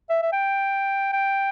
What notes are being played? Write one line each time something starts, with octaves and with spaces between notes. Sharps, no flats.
E5
E5
G5
G5